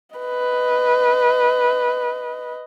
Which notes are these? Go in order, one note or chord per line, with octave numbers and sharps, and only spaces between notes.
B4 D#5